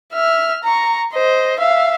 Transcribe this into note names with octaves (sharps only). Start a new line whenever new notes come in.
E5 F6
A#5 C#6
C5 D#5
E5 F5